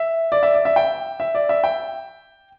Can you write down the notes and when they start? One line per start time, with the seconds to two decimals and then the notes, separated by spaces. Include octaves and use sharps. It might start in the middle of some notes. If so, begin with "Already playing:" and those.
Already playing: E5
0.32 D5
0.43 E5
0.54 D5
0.65 E5
0.76 G5
1.20 E5
1.35 D5
1.49 E5
1.64 G5